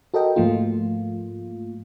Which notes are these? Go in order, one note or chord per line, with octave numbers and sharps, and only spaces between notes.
F#4 A4 A#4 D#5 G5
G#2 F3 A3 A#3 F4